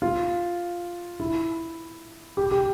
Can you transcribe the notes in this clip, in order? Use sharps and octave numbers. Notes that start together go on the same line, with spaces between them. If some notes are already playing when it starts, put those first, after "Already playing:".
F4
E4
G4
G4